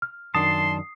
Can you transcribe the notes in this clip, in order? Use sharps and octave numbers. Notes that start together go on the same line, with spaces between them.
F6
F#2 D#3 D4 A5 C6 D#6 C7